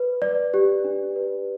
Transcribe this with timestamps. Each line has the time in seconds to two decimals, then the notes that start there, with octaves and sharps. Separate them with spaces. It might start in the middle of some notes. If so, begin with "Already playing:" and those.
Already playing: B4
0.22 D5
0.54 G4
0.84 D4
1.16 B4